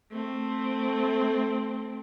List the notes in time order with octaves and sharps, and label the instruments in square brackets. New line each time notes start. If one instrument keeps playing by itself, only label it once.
[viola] A3 C4